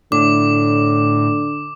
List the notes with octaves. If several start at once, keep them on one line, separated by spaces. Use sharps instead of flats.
A2 D3 D6